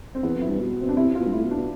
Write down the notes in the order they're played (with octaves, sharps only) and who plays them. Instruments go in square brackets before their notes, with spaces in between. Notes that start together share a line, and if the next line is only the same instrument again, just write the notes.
[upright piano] C4
[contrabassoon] E2 [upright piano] B3
[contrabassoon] F2
[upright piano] E4
[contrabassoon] G2
B2
[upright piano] C4
D4
[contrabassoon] C3 [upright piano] E4
[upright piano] F4
[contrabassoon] B2
G2
[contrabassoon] A2 [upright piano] E4
[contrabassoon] B2
[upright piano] D4
[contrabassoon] B2